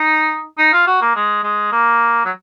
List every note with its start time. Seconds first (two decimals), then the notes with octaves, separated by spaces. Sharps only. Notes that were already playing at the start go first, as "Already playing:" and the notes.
Already playing: D#4
0.58 D#4
0.73 F4
0.87 F#4
1.02 A#3
1.15 G#3
1.44 G#3
1.72 A#3
2.26 F#3